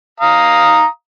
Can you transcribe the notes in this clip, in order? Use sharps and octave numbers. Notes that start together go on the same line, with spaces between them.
F5 A#5 D#6